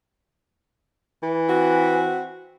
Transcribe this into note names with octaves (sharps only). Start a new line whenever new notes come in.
E3
C4 F#4